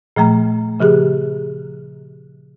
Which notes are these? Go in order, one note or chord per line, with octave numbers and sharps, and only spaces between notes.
A#2 F3 A3 A#5
C#3 F3 G4 G#4